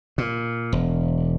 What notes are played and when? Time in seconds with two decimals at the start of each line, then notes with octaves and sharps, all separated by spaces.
0.18 A#2
0.73 E1